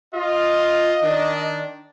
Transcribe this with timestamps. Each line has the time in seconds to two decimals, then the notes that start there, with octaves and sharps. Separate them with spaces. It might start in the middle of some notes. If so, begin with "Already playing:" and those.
0.14 F4 D#5
1.03 D#3 D4